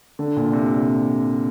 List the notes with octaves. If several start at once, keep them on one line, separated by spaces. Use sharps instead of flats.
D3
A#2
C3